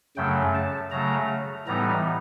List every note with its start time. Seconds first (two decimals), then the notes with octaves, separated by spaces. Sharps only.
0.17 F#2 C#3 F#3 A3 G5
0.55 A5
0.91 C#3 F#3 A3 A#5
1.67 A2 E3 G3 B3 D#4 A#5